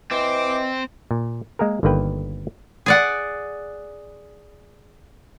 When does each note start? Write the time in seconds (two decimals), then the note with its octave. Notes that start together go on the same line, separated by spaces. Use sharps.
0.11 E3 C4 D#5 D6
1.11 A#2
1.59 G#3 A#3 G#4 A#4
1.83 G1 D3 D#3 A#3 B4 G5
2.86 G#4 D5 F#5